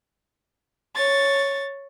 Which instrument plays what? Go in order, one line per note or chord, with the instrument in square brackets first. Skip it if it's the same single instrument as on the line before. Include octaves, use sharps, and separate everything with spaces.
[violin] C#5 A6